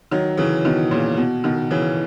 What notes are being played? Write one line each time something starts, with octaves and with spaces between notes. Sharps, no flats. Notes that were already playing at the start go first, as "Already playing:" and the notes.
D#3 F#3
C#3 E3
B2 D#3
A#2 C#3
B2
B2 D#3
C#3 E3